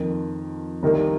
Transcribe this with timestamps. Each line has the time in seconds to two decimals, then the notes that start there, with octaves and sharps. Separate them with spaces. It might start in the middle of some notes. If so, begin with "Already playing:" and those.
Already playing: F2 D#3 A#3
0.83 C2 C3 D#3 G3 A#3